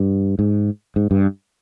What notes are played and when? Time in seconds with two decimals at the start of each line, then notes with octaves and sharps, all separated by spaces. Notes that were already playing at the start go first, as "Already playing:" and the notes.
Already playing: G2
0.39 G#2
0.96 G#2
1.11 G2